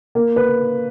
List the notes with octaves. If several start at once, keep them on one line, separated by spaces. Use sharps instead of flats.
A#3
B4